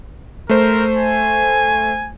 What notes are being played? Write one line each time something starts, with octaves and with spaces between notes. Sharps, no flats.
A3 A#4 C5
G#5